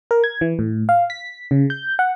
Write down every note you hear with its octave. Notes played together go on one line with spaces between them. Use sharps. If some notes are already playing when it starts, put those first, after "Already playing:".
A#4
G#6
E3
A2
F5
B6
C#3
G6
F#5